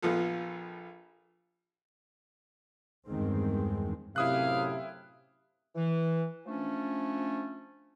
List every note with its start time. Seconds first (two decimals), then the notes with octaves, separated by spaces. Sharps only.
0.02 A#1 F3 B3 F4 A4
3.08 E2 G2 D#3 G#3 C4
4.16 F#2 A2 C3 E4 F5 D#6 F#6
5.75 E3
6.46 F3 A3 C#4 D4